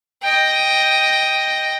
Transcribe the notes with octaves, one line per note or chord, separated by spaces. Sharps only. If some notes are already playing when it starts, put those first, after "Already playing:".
D#5 G5